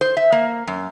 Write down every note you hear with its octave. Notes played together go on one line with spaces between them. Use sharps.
C5
E5
A#3
F#2